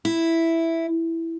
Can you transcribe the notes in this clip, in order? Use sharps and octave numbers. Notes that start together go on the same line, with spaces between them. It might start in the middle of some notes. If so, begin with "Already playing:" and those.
E4